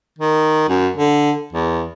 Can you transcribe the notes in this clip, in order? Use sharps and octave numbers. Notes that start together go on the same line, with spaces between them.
D#3
F#2
D3
E2